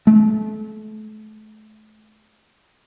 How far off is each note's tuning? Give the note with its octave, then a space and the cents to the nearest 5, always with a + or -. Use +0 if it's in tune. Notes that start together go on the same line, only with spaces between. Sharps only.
A3 -35